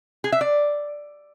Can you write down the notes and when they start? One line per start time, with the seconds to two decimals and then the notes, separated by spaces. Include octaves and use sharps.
0.24 G#4
0.32 E5
0.41 D5